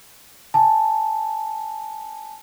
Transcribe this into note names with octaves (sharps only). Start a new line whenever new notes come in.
G#5 A5